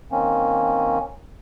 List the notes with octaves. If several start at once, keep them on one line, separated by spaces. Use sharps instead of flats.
D#3 A#3 C4 C#4